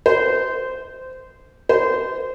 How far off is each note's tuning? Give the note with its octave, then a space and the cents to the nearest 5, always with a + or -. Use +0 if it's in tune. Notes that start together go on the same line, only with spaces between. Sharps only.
C5 -20
C5 -25